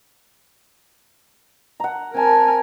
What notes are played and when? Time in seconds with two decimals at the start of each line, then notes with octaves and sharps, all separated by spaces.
1.80 F#5 A#5
2.15 C4 A#4 G#5 A5